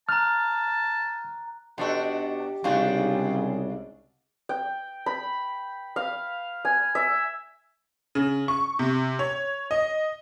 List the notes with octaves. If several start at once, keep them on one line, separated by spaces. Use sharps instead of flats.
A5 A#5 F6 F#6
B2 D4 D#4 F#4 G4 A4
C2 G#2 C#3 D4 F4 F#4 G5
G5
B5
F5
G#5
E5
C#3
C#6
C3
C#5
D#5